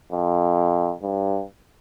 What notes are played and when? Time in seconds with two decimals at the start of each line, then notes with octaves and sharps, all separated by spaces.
0.12 F2
1.02 G2